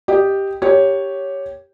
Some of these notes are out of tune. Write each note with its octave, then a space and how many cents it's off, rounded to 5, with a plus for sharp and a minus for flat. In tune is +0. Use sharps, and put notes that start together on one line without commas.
G4 +0 D#5 +0
G4 +0 A#4 +0 C#5 +0